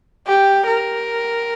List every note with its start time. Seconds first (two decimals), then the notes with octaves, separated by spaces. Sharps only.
0.27 G4
0.67 A#4